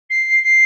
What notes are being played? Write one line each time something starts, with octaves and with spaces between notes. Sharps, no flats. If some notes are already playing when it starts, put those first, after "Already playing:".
C7
C7